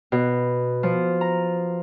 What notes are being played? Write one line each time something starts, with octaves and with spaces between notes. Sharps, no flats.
B2
F3
A#5